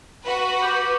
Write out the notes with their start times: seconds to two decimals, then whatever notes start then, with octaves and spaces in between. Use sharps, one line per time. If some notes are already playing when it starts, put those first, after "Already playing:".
0.24 F#4 B4
0.62 G4